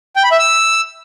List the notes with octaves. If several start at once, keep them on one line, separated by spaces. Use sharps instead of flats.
G5
B5
E5
E6